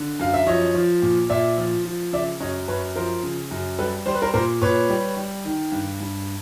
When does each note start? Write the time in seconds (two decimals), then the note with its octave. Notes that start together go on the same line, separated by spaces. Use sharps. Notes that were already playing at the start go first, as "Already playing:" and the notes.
Already playing: D3
0.19 F#2 F5
0.34 E5
0.46 F3 C#5 D#5
0.74 F3
1.02 A#2
1.29 A#2 D5 E5
1.57 F3
1.84 F3
2.13 C#3 D5 E5
2.40 F#2 C#5 D#5
2.68 F#2 B4 C#5
2.96 F3 A#4 C5
3.23 C#3
3.51 F#2
3.78 G3 A4 B4
4.06 G3 C5
4.14 B4
4.22 A#4 C5
4.34 A#2 A#4 C5
4.62 A#2 B4 C#5
4.89 G3
5.17 G3
5.45 D#3
5.72 G2
6.00 G2